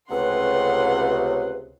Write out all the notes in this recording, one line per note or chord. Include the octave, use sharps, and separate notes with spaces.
C#2 C3 A3 C#4 B4 C#5 F#5 C6